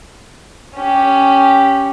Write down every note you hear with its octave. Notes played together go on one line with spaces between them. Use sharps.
C#4 G4